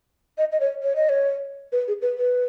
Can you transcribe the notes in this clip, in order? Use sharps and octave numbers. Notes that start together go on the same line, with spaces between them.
D#5
D#5
C#5
C#5
D#5
C#5
B4
G#4
B4
B4